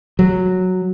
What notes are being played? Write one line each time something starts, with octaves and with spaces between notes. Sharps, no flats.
F#3